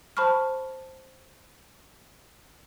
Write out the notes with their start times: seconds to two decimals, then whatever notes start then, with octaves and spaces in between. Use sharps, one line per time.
0.17 C5 A5 B5 C#6 F6